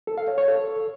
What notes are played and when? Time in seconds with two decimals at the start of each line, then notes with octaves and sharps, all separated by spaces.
0.07 A4
0.18 F5
0.28 C#5
0.38 C#5
0.48 A4